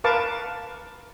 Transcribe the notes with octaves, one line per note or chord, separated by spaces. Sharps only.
A#4 B4 F5 A5 C#6 D6